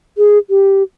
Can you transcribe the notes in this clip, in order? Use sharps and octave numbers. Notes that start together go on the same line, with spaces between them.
G#4
G4